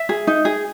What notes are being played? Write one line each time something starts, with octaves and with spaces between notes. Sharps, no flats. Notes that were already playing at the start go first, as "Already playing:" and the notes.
Already playing: E5
G#4
D#4
G#4